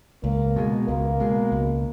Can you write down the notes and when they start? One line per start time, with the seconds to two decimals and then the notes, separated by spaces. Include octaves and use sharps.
0.24 C#2 A#3
0.56 B2 G#3
0.88 C#2 A#3
1.20 B2 G#3
1.52 C#2